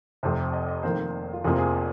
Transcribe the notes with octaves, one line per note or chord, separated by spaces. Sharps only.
F1 F2 C3 C5
D#5
D#5
F1 F2 D#3 A#3 C5
F4
F1 F2 C3 F3 A#3 G#4
G#4